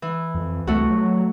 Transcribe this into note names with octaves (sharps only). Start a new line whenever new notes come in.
E3
F2
C2 A3 F#4
F#3